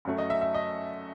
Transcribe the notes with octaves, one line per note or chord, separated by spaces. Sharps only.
F#2 F#3 A3
D#5
E5
E5
D#5